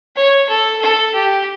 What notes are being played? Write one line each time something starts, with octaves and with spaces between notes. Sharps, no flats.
C#5
A4
A4
G4